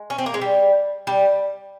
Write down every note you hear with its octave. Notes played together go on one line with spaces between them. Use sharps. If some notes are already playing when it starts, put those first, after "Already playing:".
Already playing: G#3
C#4
C4
A#3
G#3
G3
G3